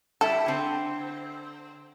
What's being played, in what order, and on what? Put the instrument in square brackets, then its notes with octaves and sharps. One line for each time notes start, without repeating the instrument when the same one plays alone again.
[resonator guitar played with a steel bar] G3 E4 [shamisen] A4
[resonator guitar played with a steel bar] D3 C4